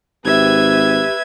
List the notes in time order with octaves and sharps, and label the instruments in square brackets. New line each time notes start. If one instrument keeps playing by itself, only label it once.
[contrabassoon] G#1 [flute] G4 [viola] B4 E5 [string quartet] G#6